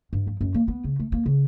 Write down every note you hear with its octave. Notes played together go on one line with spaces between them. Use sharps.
G2
F3
F#2
A#3
B3
C#3
A3
A#3
C#3